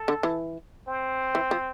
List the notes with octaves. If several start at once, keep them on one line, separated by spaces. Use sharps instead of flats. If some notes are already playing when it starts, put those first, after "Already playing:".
Already playing: A4
D3
E3
C4
E3
F3